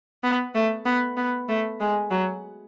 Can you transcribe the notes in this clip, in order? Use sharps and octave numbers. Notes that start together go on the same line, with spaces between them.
B3
A3
B3
B3
A3
G#3
F#3